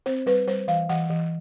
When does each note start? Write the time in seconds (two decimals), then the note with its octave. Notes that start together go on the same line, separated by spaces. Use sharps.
0.06 C4 C5
0.26 G3 B4
0.47 G3 C5
0.68 E3 F5
0.89 E3 F#5
1.10 E3